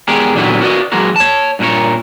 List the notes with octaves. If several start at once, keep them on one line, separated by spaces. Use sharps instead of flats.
E2 G#3 G4 G#4 A#4
A#2 D3 E3 F#3 G3 B3
F#4 A#4 B4 D5 D#5
E3 F#3 G#3 A#3 F#4 A#4
C#5 A5
G2 A#2 D4 A#4 C#5